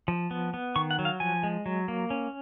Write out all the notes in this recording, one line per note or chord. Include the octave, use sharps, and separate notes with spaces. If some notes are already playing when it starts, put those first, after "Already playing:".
F3
B3
B3
D#3 C#6
F#5
F#3
F5
F3 G#5
G#3
F#3
A#3
C#4